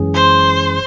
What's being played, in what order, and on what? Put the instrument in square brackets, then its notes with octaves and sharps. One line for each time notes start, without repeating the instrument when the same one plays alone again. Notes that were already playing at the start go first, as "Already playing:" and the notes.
Already playing: [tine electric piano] F#2 E3 G#3 C#4 G#4
[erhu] C5